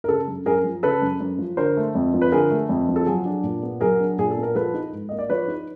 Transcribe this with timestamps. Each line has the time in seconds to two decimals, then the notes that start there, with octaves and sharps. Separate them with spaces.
0.04 A#4
0.08 C#3 A4
0.27 F#2
0.46 F#2 G#4 A#4
0.64 F3
0.83 C#3 A4 B4
1.02 F#2
1.20 F#2
1.38 F3
1.57 D3 A#4 C5
1.77 A3
1.95 F2
2.14 F3
2.22 B4
2.32 D3 G#4 A#4
2.51 A3
2.69 F2
2.89 F3
2.96 A4
3.06 F#3 G#4
3.25 D4
3.43 A#2
3.63 B3
3.81 F#3 G#4 A#4
4.00 D4
4.18 A#2 G#4
4.31 A4
4.37 B3
4.43 A#4
4.55 F3 A4 B4
4.74 D#4
4.92 G#2
5.09 A#3 D#5
5.19 D5
5.30 F3 B4 C#5
5.48 D#4